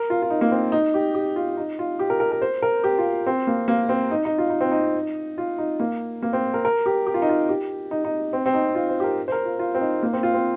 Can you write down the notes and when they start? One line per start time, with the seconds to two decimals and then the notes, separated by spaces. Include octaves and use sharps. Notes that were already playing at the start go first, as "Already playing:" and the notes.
Already playing: A#4
0.10 F4
0.22 F4
0.30 D#4
0.41 A#3
0.51 C4
0.72 D#4
0.94 G4
1.14 G4
1.36 F4
1.57 D#4
1.79 F4
1.99 G4
2.10 A#4
2.20 A#4
2.32 A#4
2.42 C5
2.62 A#4
2.84 G4
2.98 F4
3.27 C4
3.47 A#3
3.68 A#3
3.89 C4
4.11 D#4
4.25 D#4
4.38 F4
4.50 D#4
4.61 C4
4.72 D#4
5.38 F4
5.58 D#4
5.80 A#3
6.22 A#3
6.33 C4
6.54 A#4
6.65 A#4
6.86 G4
7.07 G4
7.14 F4
7.22 D#4
7.29 F4
7.49 G4
7.91 D#4
8.05 D#4
8.33 C4
8.46 C4
8.54 D#4
8.75 F4
8.89 C5
9.00 G4
9.04 A#4
9.28 C5
9.32 A#4
9.45 F4
9.59 F4
9.75 C4
9.81 D#4
10.03 A#3
10.13 C4
10.23 F4
10.34 C4